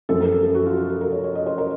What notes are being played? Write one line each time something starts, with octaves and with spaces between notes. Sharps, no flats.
F#2 F3 A4
A#4
A4
A4
F#4
F4
F#4
A4
A#4
C#5
C#5
D#5
C5
A#4